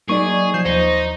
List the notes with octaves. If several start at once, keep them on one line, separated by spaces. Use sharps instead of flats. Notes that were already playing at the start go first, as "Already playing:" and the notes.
F#3 A#3 D#4 G#4 D5 C#6
F3 G6 C7 E7
D#2 D#4 C5